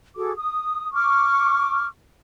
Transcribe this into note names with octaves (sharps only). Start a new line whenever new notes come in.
F#4 G#4 A4 D6
D#6
C#6 D6 F6